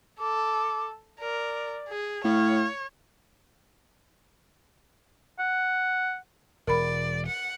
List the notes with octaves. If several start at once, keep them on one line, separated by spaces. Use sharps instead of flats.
A4 D6
A#4 D5
G#4
A2 C#5 F5
F#5
E1 A#4 D5 B5
F#5